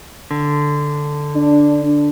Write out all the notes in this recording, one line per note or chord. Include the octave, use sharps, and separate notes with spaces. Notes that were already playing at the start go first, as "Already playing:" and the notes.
D3
D4